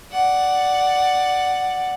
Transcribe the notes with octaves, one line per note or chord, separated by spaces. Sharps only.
D5 F#5